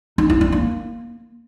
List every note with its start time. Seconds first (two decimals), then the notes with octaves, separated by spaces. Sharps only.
0.18 D#4
0.30 E4
0.41 D4
0.52 A#3